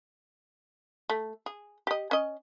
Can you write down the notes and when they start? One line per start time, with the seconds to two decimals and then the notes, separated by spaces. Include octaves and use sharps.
1.10 A3
1.46 G#4
1.87 G4 D#5
2.11 C#4 D#5